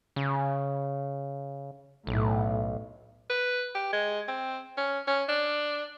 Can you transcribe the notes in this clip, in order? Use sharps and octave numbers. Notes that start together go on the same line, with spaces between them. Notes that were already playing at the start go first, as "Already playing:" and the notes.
C#3
B1 A2
B4
G4
G#3
C4
C#4
C#4
D4